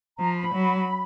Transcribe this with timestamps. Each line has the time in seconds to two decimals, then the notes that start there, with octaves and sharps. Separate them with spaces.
0.18 F3 A#5
0.36 B5
0.54 F#3